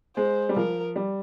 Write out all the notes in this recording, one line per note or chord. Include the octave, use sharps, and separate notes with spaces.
G#3 C5
G3
F3 A#4
G3